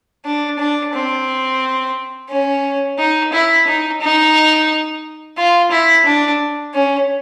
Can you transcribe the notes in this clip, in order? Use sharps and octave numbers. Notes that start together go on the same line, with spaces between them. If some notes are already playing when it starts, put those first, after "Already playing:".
D4
D4
C4
C#4
D#4
E4
D#4
D#4
F4
E4
D4
C#4